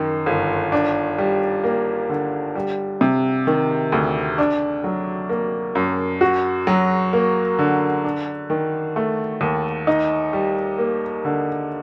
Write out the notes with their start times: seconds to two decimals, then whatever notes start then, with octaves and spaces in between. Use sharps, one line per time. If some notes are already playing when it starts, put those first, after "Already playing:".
Already playing: F#2 D#3
0.26 G1
0.72 D4
1.18 G3
1.64 A#3
2.09 D3
2.55 G3
3.01 C3
3.47 D#3
3.92 D2
4.38 D4
4.84 F#3
5.29 A#3
5.75 F#2
6.21 F#4
6.67 F#3
7.13 A#3
7.59 D3
8.04 D4
8.50 D#3
8.96 A3
9.41 D#2
9.87 D#4
10.33 G3
10.78 A#3
11.25 D3